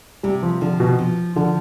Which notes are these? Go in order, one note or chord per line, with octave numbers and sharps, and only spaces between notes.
C3 G3
F3
D3 F3
B2
F3
D3 F3